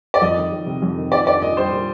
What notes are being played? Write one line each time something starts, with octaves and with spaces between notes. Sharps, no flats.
D5
F2 D#5
D#3
F2
C3
F2
D#3
A#2 D5
D4 D5
A#2 D#5
G3 C5
A#2